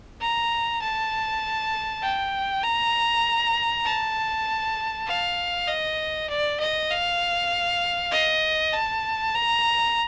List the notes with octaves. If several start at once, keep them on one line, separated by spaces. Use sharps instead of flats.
A#5
A5
G5
A#5
A5
F5
D#5
D5
D#5
F5
D#5
A5
A#5